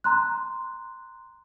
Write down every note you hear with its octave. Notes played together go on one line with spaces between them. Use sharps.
A#5 C6 F#6